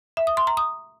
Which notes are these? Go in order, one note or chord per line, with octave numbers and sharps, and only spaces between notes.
E5
D#6
C6
A#5
D#6